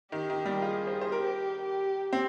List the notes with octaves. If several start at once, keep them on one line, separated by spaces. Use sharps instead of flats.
D#3 G4
D#3
G3
F4 G#4
C5
C5
G4 A#4
G4
C4